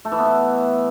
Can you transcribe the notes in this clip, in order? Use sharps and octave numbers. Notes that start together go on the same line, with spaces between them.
A3
E3
B3
E3